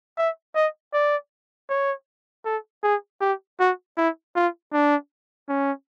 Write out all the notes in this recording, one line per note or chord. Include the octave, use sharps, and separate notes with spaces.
E5
D#5
D5
C#5
A4
G#4
G4
F#4
E4
F4
D4
C#4